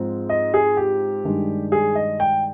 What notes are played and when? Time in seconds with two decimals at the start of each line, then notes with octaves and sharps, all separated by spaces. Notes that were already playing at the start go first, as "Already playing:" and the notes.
Already playing: G#2 F3 C4
0.29 D#5
0.54 G#4
0.77 G4
1.25 G2 D#3 G#3 D4
1.72 G#4
1.95 D#5
2.20 G5